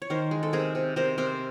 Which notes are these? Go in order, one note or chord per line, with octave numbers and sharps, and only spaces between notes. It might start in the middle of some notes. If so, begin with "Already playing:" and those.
C#5
D#3 A#4 C5
G#3
A4
C3 G#4 A#4
C3
C3 A#4 C5
C3 A#4 C5